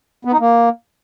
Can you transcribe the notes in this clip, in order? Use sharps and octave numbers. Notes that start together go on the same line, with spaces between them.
B3
D#4
A#3